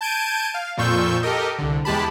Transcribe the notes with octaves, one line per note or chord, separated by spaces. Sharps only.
A5 G6 G#6 D7 D#7
F5
F2 A#2 F4 C#6 E6 G6
G4 A4 A#4 D#5
C2 D3
E2 G#3 G4 A5 B5